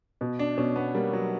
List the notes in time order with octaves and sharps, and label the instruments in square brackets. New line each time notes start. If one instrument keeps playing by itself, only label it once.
[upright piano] B2
[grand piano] D4
[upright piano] B2 [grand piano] C#4
[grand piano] B3
[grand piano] G3 [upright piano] A#3
[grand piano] F#3